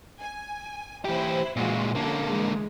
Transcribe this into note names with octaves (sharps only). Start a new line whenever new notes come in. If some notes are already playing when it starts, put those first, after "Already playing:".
G#5
E3 E4 G4 C5
A#2 E3 G#3 F4 F#4
D3 A#3 C#4 A4
E3 G#3